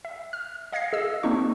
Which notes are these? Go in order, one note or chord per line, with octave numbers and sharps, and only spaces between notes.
E5
F6
D#5 F5 G#6 A#6 C7
G#4 D#5 E6
A#3 C4 D4 D#4 C#6